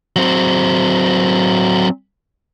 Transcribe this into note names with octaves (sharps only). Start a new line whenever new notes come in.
F#3 C4